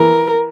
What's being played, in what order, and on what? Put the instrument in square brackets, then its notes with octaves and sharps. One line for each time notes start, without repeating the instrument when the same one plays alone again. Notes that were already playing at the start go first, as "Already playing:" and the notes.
Already playing: [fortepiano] E3 [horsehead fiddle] A#4